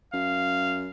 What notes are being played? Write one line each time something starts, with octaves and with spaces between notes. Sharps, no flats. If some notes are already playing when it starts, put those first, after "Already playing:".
F#2 F5